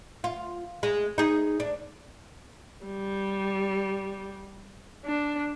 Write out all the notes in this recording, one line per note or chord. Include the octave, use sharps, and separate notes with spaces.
F4
G#3
D#4 G#4
D4
G3
D4